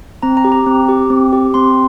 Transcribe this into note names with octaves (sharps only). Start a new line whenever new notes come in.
C4 A#5
A#5
G4
A#5
C4
G4
C4
G4
C4 C6